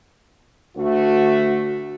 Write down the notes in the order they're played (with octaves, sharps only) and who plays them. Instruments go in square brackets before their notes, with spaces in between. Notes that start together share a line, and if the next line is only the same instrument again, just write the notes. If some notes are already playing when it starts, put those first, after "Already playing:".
[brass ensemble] D2 A3 F#4